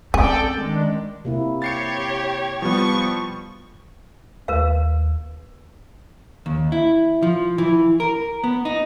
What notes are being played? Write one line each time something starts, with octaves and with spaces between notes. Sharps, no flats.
C4 C#4 G#4 A4 D5 G5
D#3 G#3 D4
C3 A#3 E4
G4 C#5 A6 C7 C#7
F3 G3 B3 C#6
D#2 A#4 B4 F5
D#2
E4
F3
E3
A#4
B3
D#4